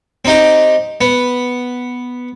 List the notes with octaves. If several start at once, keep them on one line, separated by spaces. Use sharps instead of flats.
C4 D#4 G4
B3